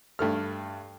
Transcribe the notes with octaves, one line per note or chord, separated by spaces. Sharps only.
G2 A3 F6